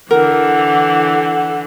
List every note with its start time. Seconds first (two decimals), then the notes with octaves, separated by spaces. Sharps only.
0.11 D3 E3 A#4 F#5